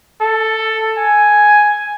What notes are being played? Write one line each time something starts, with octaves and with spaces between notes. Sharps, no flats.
A4
G#5